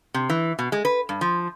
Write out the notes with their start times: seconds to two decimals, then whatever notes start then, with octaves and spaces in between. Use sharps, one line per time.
0.14 C3
0.30 E3
0.59 B2
0.72 G#3
0.85 B4
1.09 G2
1.21 F3